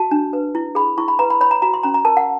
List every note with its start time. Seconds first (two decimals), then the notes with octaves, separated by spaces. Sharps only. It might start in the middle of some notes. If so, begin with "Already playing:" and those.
Already playing: F#4 A5
0.11 D4
0.33 B4
0.55 E4
0.75 G#4 B5
0.98 E4 C#6
1.08 B5
1.19 B4 A#5
1.30 B5
1.41 C#5 B5
1.51 A#5
1.62 F#4 A#5
1.74 C6
1.83 C#4 A#5
1.94 A#5
2.05 A#4 A5
2.17 F#5